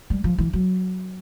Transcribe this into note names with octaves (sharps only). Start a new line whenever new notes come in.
G3
F3
E3
F#3